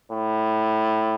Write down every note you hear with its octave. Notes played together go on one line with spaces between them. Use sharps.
A2